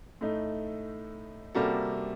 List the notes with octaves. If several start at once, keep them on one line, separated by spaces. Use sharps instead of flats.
A2 A3 D#4
C3 G3 A#3 F#4 A4